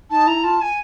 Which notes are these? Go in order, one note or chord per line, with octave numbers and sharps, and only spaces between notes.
D#4 A5
E4 A#5
F4 A5
G#5